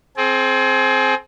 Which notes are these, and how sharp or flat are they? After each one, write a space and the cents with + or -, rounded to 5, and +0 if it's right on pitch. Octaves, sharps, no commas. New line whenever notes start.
C4 +10 G#4 +35